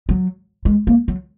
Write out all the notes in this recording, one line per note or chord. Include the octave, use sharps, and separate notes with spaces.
F#3
G#3
A#3
F#3